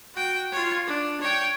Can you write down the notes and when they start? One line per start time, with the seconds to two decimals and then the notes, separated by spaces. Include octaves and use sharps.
0.14 F#4 G5
0.52 F4 C#5
0.87 D4
1.21 C#5 G5